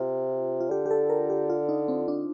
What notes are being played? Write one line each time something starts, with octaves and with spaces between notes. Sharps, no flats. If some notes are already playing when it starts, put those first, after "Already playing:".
Already playing: C3 F4
F4
D3 G4
G4
A4
A#4
G4
F4
D#4
C4
D4